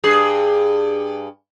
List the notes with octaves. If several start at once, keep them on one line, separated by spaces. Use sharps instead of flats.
G2 G#4